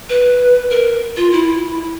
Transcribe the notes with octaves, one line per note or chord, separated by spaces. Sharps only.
B4
A#4
F4
E4